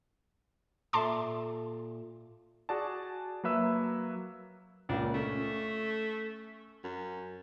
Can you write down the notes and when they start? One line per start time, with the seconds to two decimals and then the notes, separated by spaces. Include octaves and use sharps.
0.93 A#2 A4 E5 A5 C6 D6
2.69 F#4 G#4 D5 G#5 A5
3.44 F#3 A#3 B4 E5 E6
4.89 C#2 A#2 D4
5.14 A3 C#4
6.84 F#2